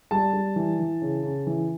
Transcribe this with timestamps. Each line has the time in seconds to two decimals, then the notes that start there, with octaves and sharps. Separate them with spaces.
0.11 G3 A5
0.33 G3
0.56 E3
0.79 E3
1.02 C#3
1.23 C#3
1.47 E3